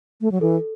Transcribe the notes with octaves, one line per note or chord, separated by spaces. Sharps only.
A3
F#3
E3 A4